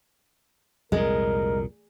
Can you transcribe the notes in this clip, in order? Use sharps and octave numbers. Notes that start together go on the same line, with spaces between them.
C2 F2 A#2 G#3 A#4